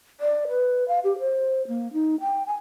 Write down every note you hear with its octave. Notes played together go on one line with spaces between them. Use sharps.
D5
B4
F5
G4
C5
A#3
D#4
G5
G#5